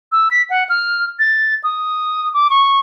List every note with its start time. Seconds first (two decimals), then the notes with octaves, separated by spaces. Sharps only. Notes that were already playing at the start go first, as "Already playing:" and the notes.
0.12 E6
0.31 B6
0.50 F#5
0.69 F6
1.19 A6
1.64 D#6
2.34 D6
2.50 C#6